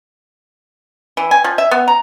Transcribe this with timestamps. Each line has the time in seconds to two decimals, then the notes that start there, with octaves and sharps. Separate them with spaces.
1.17 E3
1.31 G#5
1.44 F3
1.58 E5
1.71 B3
1.88 A#5